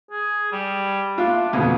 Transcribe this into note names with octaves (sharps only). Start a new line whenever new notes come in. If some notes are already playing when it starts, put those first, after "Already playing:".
G#4
G3
D4 F4 E5
F2 B2 D3 G#4